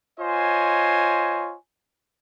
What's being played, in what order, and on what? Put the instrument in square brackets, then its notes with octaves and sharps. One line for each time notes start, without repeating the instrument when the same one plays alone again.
[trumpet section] F4 C5 C#5 D#5 G#5